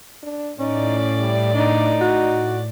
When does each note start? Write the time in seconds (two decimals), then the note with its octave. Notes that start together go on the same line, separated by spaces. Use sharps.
0.23 D4
0.60 A2 C#4 D#4 D5
1.19 G3
1.55 D4 D#4
2.01 F#4